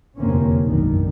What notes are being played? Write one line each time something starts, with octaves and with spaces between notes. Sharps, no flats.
F1 E2 D3 A#3 C4 C#4
F#1 B1 G#2 B2 D3 D#3